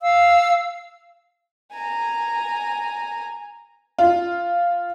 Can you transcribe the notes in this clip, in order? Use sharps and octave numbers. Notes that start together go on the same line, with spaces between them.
F5 E6
G#5 A#5
F4